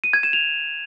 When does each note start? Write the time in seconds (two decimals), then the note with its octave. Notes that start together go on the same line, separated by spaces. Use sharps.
0.04 D#7
0.13 G#6
0.23 E7
0.33 F7